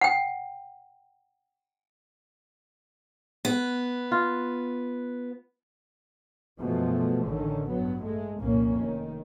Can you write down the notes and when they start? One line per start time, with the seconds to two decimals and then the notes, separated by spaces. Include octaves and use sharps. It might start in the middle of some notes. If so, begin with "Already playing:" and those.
0.01 F#5 G5
3.45 B3
4.12 F4
6.59 F#2 B2 F3 G#3 A3
7.26 A1 D3 D#3 C#4
7.69 G2 F#3 B3
8.03 G#3 A3
8.41 C2 F2 A#2 A#3 C#4
8.80 F1 D#3